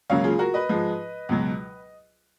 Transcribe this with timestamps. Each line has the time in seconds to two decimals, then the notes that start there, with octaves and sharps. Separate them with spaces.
0.10 C#2 C#3 F#3 A#3 C#5 F5
0.24 F4 G#4
0.39 F#4 A#4
0.54 B4 D#5
0.69 G#2 F3 G#3
1.29 C#2 B2 F#3